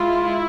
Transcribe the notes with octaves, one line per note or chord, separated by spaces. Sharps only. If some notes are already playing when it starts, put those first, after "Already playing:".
Already playing: G#3 E4 F4